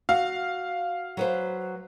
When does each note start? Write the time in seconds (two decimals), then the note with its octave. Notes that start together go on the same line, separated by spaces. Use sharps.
0.09 F#4 F5
1.17 F#3 B4 C5